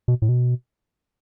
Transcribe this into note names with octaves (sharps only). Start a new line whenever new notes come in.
B2
A2
B2